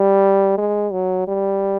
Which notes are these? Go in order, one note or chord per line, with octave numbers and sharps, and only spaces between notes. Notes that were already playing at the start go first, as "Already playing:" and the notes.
Already playing: G3
G#3
F#3
G3